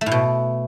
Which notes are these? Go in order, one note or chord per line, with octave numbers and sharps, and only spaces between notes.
A3
A2
B2